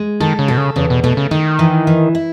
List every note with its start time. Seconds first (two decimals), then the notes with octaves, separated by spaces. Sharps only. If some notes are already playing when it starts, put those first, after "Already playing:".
Already playing: G#3
0.20 D#3 A4
0.39 C#3
0.48 B2 A4
0.57 C#3
0.76 E2 C#3
0.90 B2
1.04 B2 A3
1.17 C#3
1.31 D#3 D#4
1.59 E3
1.87 E3
2.15 E4